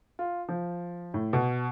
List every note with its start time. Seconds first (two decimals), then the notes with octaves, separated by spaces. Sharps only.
0.19 F4
0.49 F3
1.14 A2
1.33 B2